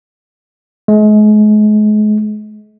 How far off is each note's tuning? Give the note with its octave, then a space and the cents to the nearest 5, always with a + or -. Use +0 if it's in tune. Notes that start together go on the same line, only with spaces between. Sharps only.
G#3 +35